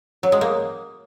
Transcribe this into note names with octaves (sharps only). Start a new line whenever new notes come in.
F#3
G#3
A#3